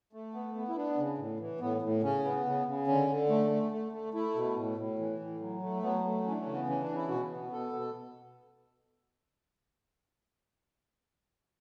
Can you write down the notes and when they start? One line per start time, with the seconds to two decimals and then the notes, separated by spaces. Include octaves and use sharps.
0.13 A3
0.34 B3
0.55 B3
0.69 E4
0.76 B3 D4
0.97 C#3
1.18 A2
1.40 E3
1.60 A2 B3
1.82 A2
2.02 C#3 C#4
2.24 B3
2.46 C#3
2.66 C#3
2.87 D3 C#4
3.08 D3
3.29 A3
3.51 A3
3.72 A3
3.92 A3
4.14 A3 E4
4.35 B2
4.56 A2
4.78 A2
4.99 E3
5.19 A2
5.40 F#3
5.62 A3
5.82 F#3 B3
6.04 A3
6.25 E3 C#4
6.32 D4
6.39 C#4
6.46 C#3
6.53 B3
6.67 E3 C#4
6.81 D4
6.88 C#3
6.95 E4
7.09 B2 F#4
7.31 B3
7.52 B2 A4
7.73 B2